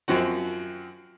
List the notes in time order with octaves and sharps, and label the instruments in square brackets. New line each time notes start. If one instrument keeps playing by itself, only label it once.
[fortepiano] F#2 F3 C4 F#4